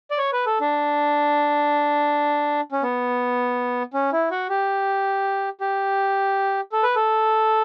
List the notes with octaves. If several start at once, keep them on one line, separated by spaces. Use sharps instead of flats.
D5
C#5
B4
A4
D4
C#4
B3
C#4
E4
F#4
G4
G4
A4
B4
A4